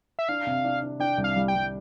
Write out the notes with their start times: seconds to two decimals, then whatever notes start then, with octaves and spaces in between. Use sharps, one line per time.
0.19 E5
0.29 D4 F5
0.47 C3
0.64 D4
0.82 D4
1.00 D4 G5
1.18 C2
1.24 F5
1.36 G3
1.48 G5
1.55 G3